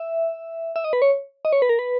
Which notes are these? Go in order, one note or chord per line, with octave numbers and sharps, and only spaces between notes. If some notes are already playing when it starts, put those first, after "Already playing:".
Already playing: E5
E5
D#5
B4
C#5
D#5
C#5
B4
A#4
B4